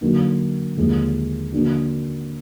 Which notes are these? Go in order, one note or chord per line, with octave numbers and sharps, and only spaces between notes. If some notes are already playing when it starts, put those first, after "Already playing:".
D3 F#3 A#3 D#4 F#4
D#2 D3 F3 G#3
D3 F3 A#3 D4 F#4